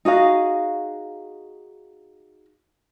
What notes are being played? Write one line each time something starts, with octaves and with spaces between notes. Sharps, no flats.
D#4 F#4 G#4 F5